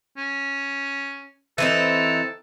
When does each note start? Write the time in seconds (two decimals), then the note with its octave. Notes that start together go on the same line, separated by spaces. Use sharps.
0.17 C#4
1.58 E3 C4 D#4 A4